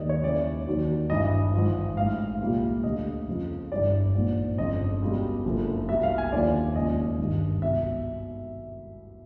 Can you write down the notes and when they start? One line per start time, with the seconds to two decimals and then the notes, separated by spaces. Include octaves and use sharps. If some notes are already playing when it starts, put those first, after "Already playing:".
Already playing: D#2 D#3 G3 D5 D#5
0.09 C#5
0.23 D#2 C#3 E3 D5
0.67 D#2 D#3 F#3
1.10 G#1 G2 E3 D#5
1.54 G#1 G#2 F3
1.97 A1 G#2 E3 F5
2.41 C2 A#2 G3
2.84 D2 D3 G3 D#5
3.28 F2 C#3 F3
3.72 G1 G2 E3 G3 D5
4.15 A#1 G#2 F3
4.58 G1 F2 C#3 D#5
5.02 C#2 B2 G3
5.45 F#1 F#2 D3 F3
5.88 C2 B2 G3 E5
6.03 F5
6.18 G#5
6.32 D#2 D3 F3 D5
6.75 E1 D#2 C#3 F3 D#5
7.19 G#1 G2 D#3 G3
7.62 C2 B2 F#3 E5